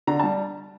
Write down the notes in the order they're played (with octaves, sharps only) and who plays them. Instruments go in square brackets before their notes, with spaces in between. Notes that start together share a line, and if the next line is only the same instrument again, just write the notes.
[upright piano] D3 A#5
G3 A5